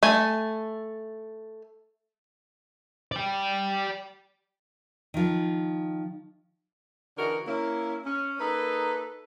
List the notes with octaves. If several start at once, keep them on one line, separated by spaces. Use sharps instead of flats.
A3 G#5
D5 G5
D#3 F3
D3 E3 D#4 F#4 G#4 A#4
A#3 C#4 E4
C#4
A#3 D#4 A4 B4